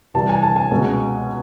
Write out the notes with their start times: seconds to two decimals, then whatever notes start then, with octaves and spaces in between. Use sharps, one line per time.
0.14 C2 C3 E3 G3 A5
0.29 G#5
0.42 A5
0.56 G#5
0.71 C#2 B2 G#3